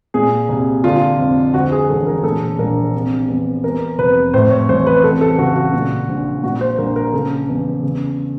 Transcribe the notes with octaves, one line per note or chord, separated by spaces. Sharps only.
A#2 G#4
C2
D3 F4
F2
D2 F#4
G#4
E1 A4
A#4
A#2 A4
A#1 A#4
C3
E2
E2 A#4
F1 B4
A2 C5
C#5
A1 C5
B4
C3 A4
A4
C#2 F#4
F#4
A#2
A#1
A#2 F#4
C5
A#1 A#4
A#4
C#3 A4
E2
C#3